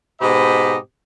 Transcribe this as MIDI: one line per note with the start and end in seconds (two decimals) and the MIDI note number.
0.21 0.77 44
0.21 0.77 47
0.21 0.77 60
0.21 0.77 67
0.21 0.77 75
0.21 0.77 83